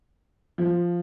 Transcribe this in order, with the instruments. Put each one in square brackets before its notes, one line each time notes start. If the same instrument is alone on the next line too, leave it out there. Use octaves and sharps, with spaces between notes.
[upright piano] F3